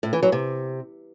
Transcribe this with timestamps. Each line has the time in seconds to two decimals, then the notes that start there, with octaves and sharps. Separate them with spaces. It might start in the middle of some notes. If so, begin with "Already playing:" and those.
0.03 A2
0.13 E3
0.23 F#3
0.32 C3